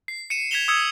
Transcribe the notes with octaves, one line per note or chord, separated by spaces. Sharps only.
C7
C#7 D#7 E7
G#6 B6 C7 E7 F7 G7
D#6 E6 G#6 C#7